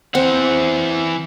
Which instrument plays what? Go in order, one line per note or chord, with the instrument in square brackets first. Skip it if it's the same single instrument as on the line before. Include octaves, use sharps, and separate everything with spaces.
[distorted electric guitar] E3 F#5 [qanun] C4